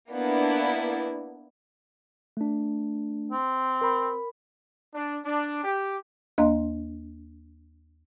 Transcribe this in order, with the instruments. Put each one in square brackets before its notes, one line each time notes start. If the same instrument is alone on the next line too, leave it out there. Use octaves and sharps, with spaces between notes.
[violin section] A#3 B3 D4 E4
[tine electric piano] A3 D4
[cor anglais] C4
[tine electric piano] A#4 B5
[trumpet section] D4
D4
G4
[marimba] D#2 A#3 D4 D#5 A#5 C6